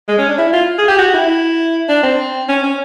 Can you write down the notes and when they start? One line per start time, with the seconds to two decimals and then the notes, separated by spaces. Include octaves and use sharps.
0.08 G#3
0.18 C#4
0.29 D4
0.38 E4
0.53 F4
0.78 G#4
0.88 G4
0.98 F#4
1.14 E4
1.89 D4
2.03 C4
2.49 C#4
2.63 C#4